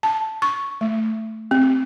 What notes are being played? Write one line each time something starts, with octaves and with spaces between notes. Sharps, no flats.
A5
C#6
A3
C4